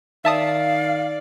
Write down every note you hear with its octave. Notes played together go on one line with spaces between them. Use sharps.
D#3 D5 E5 F5 A5 D#6